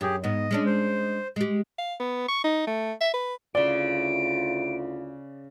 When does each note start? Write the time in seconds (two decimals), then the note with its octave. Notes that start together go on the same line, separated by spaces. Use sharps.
0.01 F#2 G4 G#4
0.24 G#2 B3 D#5
0.51 G#3 C#4 D4
0.66 C5
1.36 G#3 G4
1.78 F5
2.00 B3
2.28 C#6
2.44 D#4
2.67 A3
3.01 E5
3.14 B4
3.55 D2 C#3 E4 F4 D5 C6 D7